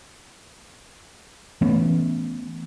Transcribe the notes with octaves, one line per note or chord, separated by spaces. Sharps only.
E3 A3 B3 C#4